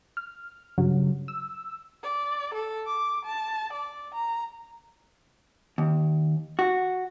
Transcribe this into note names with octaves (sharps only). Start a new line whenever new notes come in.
F6
G2 C#3 F#3
E6
D5
A4
D6
A5
D5
A#5
D#2
F#4